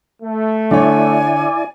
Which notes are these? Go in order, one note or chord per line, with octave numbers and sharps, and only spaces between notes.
A3
D3 E4 C#5 D5 G#5